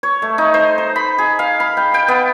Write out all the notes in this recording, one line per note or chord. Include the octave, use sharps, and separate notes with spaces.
C#5
A3
D#4
C5
A#5
B5
G#4
F5
B5
G5
G5
B3